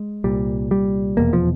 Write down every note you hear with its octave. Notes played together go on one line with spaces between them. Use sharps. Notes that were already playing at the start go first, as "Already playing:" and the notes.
Already playing: G#3
C2 A#2 G3
G3
F1 E2 B2 A#3
F3